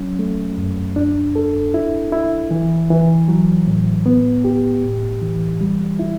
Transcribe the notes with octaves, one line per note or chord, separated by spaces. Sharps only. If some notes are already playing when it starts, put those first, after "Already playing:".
Already playing: F#3 C#4
A3
F#2
D4
A4
E4
E4
E3
E3
F#3
A2
B3
G4
A2
E3
G3
E4